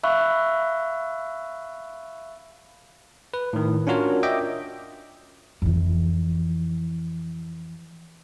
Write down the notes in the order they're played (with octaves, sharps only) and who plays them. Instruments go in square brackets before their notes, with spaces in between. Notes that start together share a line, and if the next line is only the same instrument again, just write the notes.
[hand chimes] E5 F5 B5 C#6 E6 F#6
[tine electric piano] B4
A2 D#3
C#4 D4 F4 F#4 A#4 C#5
D#5 E5 G5 D6
[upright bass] F2 E3